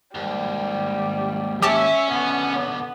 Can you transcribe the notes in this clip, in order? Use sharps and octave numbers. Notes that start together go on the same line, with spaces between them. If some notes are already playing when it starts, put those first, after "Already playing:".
D#2 G#2 G3
C#4 G4 E5 A5 D6
B2 D3 B3